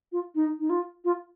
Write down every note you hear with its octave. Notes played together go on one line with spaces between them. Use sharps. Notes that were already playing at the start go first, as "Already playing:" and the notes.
F4
D#4
D#4
F4
F4